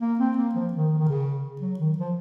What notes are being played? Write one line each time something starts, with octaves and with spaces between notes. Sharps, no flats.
A#3
C4
A#3
F3
D#3
D#3
C#3
F#3
D#3
F3